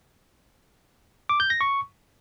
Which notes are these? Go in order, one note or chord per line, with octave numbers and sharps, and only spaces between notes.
D6
G6
A#6
C#6